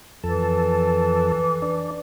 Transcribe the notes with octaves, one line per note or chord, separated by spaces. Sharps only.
F2 E3 A4
D4